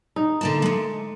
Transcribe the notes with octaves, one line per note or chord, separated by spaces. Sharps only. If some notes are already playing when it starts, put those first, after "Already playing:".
D#4
D3 A#3 A5
G#3 A3